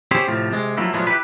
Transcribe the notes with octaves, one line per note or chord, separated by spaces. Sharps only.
C4 E4 G4 G#4 C5 C#5
A2 C3 F3
C3 G#3
F3 F#3 A3 A#3 E4
A#2 F3 F#3 G#3 A3 B3
E4 G4 B4